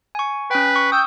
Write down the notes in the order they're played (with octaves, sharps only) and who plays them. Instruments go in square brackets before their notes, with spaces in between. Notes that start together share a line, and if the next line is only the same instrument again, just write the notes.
[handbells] G#5 C#6
[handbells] C#4 G5 [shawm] B4
[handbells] C#6
[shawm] G5 [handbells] D#6 E6 G6